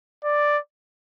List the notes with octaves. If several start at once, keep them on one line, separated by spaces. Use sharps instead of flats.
D5